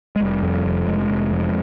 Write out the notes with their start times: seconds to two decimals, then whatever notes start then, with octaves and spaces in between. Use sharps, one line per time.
0.16 G#3
0.21 F1 G3
0.42 F2
0.65 F1
0.87 F1 G#3
1.09 F1
1.31 F2